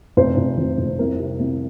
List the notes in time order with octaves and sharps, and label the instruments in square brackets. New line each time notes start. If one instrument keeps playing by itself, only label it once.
[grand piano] F1 C5
F1
F1
F1
C2 A#4
C3
C2